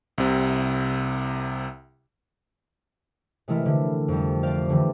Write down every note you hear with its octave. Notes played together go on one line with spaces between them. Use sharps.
C2 C3
C3 E3 G#3 A3 E4 A#4
D3
F2 G3
G4 C5 D5 F5
D3 E3 G3